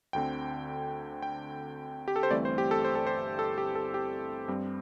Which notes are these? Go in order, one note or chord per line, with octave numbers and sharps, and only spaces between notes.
D2 D3 C4 G5
G5
G4
A4
C5
G1 G2 E3 A3 C4 D5
C5
G4
A4
C5
A4
C5
A4
G4
A4
G4
G2 G3 C4